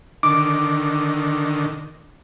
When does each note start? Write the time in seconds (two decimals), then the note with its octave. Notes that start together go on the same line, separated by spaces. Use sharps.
0.23 D3 D#3 D6